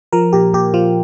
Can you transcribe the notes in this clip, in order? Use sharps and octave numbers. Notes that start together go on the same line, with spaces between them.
F3 A#4
A#2 G4
A#2 G4
F3 F4